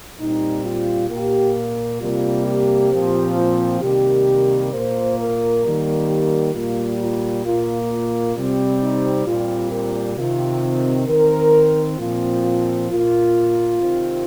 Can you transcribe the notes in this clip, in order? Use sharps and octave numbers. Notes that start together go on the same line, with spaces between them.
A#2 G3 C4 D#4
F4
A#2 A#3 G4
C3 G3 A#3 F4
G4
A#2 F3 C4
F4
C3 D#3 G3 A#3 G4
A#2 A#3 C5
A#4
D#3 G3 A#3
G4
A#2 G3 A#3 F4
F4
A#2 A#3 F4
F4
C3 G3 C4
D#4
A#2 G3 C4 F4
A#4
C3 D#3 C4 F4
D#3 C4 A#4
A#2 F3 C4 F4
F4
A#2 A#3 F4
C3 D#3 C4